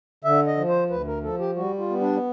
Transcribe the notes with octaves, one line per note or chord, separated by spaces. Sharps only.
D3 E5
D#5
F3
C5
D2 B4
A#4
F3 A4
G4
G3 F#4
F4
B3
D4